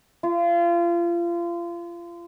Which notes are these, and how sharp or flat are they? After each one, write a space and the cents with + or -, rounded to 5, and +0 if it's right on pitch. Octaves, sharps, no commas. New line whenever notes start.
F4 -30